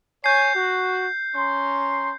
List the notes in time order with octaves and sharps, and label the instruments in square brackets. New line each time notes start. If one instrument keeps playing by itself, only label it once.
[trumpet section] C#5 G#5 [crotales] G6 C7
[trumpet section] F#4
C#4 A#5 C6